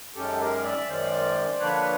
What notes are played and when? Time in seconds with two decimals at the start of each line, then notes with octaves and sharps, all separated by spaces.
0.15 F#2 D#3 G#3 C#4 G4 A4
0.40 G#4 A#4
0.63 D5 E5
0.87 F#2 D#3 G#3 C#4 C5 D5
1.60 D3 F3 A#3 D4 B4 C#5